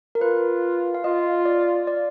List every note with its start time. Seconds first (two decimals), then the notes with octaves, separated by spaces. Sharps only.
0.15 A#4
0.21 F4 B4
0.94 F5
1.04 F4 D#5
1.45 D5
1.87 D5